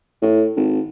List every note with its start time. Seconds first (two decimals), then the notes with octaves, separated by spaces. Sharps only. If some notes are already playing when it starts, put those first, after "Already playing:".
0.22 A2
0.56 G#1